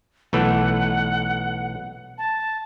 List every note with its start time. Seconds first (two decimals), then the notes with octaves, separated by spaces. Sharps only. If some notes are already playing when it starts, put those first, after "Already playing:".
0.33 B1 E3 A3 F#5
2.18 A5